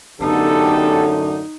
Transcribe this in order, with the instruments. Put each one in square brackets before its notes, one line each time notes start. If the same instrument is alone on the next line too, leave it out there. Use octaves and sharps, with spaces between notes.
[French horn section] F#2 A2 D3 [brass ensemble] B3 G4 A4 [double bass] D#4